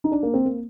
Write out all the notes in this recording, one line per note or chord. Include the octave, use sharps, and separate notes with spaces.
D#4
D4
A#3
C4
A#3